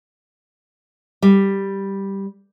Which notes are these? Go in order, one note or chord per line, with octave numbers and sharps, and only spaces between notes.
G3